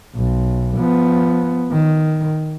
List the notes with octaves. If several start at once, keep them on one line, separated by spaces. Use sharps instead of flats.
B1
F3 B3
D#3